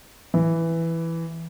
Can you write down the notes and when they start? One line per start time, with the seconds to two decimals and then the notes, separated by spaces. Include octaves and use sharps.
0.34 E3